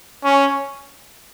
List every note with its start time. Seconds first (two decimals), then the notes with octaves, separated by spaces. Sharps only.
0.24 C#4